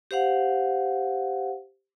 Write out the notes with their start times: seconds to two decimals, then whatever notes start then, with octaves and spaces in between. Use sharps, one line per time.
0.11 G4 C5 F5 F#5